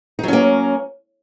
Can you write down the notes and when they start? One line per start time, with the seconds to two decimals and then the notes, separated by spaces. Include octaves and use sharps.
0.19 D#4
0.23 F#3
0.28 C#4
0.33 A#3